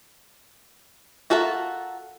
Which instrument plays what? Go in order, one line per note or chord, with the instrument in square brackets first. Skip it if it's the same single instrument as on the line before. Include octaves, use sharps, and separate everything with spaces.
[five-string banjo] F4 F#4 A4 A#4 E5